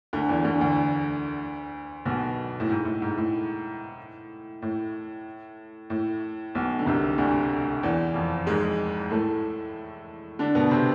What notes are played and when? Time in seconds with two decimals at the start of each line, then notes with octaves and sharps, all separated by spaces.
0.13 D2 D3
0.29 E2 E3
0.44 D2 D3
0.60 D2 D3
2.05 B1 B2
2.60 A2
2.70 G#2
2.85 A2
3.02 G#2
3.17 A2
4.62 A2
5.90 A2
6.55 B1 B2
6.79 D3
6.86 C2 C3
7.18 D2 D3
7.83 E2 E3
8.14 F2 F3
8.46 G#2 G#3
9.11 A2 A3
10.39 D3 D4
10.55 B2 B3
10.71 C3 C4